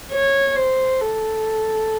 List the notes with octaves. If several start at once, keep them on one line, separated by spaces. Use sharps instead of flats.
C#5
C5
A4